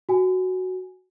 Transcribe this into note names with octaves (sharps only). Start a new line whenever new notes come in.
F#4 G#5